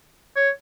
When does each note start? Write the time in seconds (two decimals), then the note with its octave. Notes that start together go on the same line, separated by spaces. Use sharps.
0.36 C#5